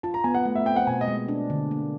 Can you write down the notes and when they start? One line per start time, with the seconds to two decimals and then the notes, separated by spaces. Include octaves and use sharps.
0.03 F4 A5
0.14 A#5
0.24 B3 G#5
0.35 F#5
0.45 A3
0.55 E5
0.66 C4 G5
0.76 F#5
0.87 B2 G#5
1.01 D#5
1.08 G#3
1.28 D4
1.50 D3
1.71 A#3